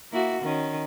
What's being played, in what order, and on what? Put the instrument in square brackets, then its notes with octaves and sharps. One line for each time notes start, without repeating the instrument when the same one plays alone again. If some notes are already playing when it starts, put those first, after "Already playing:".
[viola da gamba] A#3 E4 F#4
D#3 C#4